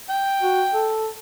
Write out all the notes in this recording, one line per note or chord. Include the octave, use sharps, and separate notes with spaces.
G5
F#4
A4